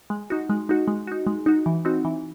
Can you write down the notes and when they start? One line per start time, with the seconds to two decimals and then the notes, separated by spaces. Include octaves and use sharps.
0.10 G#3
0.30 D#4 F#4
0.50 G#3
0.69 D#4 F#4
0.88 G#3
1.07 D#4 F#4
1.27 G#3
1.46 D#4 F#4
1.66 E3
1.85 C4 D#4 F#4
2.05 E3